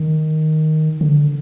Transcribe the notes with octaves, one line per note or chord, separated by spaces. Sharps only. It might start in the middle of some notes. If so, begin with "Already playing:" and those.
Already playing: D#3
D3